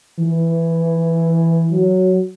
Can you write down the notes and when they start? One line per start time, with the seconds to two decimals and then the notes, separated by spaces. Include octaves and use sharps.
0.20 E3
1.72 F#3